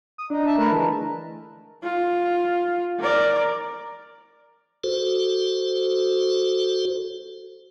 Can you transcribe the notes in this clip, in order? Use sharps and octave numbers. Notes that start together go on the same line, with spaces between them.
D#6
D4 D#4
E5 A5
A3 A#4 B4 A5
D3 E3 G#3
F4
A#4 D5
F#4 A4 C5